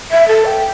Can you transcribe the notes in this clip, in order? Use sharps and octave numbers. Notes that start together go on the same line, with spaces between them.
E5
A4
G5